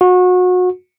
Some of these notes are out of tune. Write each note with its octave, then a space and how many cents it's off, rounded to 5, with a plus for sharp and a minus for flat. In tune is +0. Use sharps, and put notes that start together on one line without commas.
F#4 -30